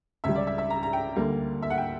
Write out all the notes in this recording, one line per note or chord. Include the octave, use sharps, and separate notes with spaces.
C#2 C#3 G3 E5
D5
E5
E5
A#5
A#5
G5
D2 D3 G3 A#3
E5
F#5
G5